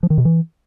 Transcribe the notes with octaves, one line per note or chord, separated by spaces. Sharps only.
F3
D#3
B2
E3